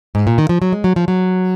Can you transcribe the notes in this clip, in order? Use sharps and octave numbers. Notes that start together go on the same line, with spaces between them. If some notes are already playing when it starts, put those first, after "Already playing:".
G#2
A#2
D#3
F3
F#3
G#3
F#3
F3
F#3